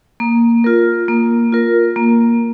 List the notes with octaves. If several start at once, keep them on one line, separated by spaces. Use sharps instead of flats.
A#3
F4 A#4
A#3
F4 A#4
A#3